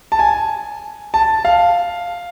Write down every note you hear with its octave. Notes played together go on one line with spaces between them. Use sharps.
A5
G#5
A5
F5